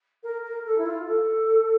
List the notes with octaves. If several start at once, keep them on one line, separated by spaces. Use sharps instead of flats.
A#4
A#4
A4
E4
F4
A4